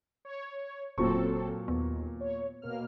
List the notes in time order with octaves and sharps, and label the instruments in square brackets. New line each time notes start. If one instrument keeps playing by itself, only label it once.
[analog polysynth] C#5
[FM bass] E1 [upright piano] A#2 F#3 C#6 [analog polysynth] C4 A4
[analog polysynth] D#2 [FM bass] B3
[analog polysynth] C#5
B2 A#3 F6